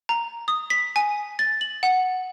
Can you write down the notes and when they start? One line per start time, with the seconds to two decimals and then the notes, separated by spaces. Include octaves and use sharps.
0.09 A#5
0.48 D#6
0.70 B6
0.96 G#5
1.39 A6
1.61 F#7
1.83 F#5